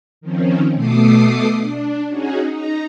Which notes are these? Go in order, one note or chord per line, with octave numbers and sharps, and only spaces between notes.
D#3 F3 C4 C#4
B2 A3 A4 D6 D#6 C7
D4
C#4 D#4 F#4 G#4
D#4 A#5